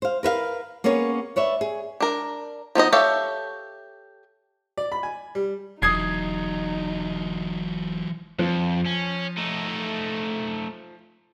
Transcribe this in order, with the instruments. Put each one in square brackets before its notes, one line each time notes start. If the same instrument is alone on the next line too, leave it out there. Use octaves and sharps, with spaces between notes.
[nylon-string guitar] C5 F5
A#4 B4 E5 F5
A#3 B3 C#4 G#4 C#5
B4 C#5 D5 E5
G#4
[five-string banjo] D4 A#4
F3 B3 D#4 D#5
G4 A4 C#5 E5 F5
[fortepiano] D5
B5
G#5
G3
[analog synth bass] F1 [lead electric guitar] E3 F#3 [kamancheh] D#4 [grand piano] D#6 G#6 C7
[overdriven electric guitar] F2 [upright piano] F3
[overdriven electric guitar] C#4
A3 D#4